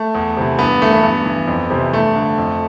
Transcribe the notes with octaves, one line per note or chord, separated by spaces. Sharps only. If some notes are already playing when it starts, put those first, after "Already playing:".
Already playing: A3
E2
C3 E3
G2 B3
E3 A3
B3
G2
E3
F2
C3 E3
G2 A3
D3
F2